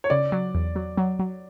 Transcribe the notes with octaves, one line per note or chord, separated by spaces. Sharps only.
C#5
C#3 D5
F#3
E2
F#3
F#3
F#3